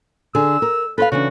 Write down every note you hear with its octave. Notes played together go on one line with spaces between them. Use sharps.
D3 G#4 E6
A#4
A4 B4 C5 F5
C#3 E3 D4 F#4